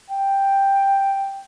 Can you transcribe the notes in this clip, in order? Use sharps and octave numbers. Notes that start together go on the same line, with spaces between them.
G5